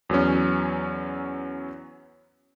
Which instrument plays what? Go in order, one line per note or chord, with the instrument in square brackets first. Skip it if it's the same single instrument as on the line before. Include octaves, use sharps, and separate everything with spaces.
[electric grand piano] E2 F#3 B3 C#4